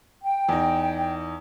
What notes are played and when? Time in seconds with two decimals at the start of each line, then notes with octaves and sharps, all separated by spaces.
0.23 G5
0.49 E2 D#4